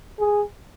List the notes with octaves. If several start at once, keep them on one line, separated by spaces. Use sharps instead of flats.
G#4